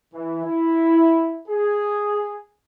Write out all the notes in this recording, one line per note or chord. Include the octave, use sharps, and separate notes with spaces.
E3
E4
G#4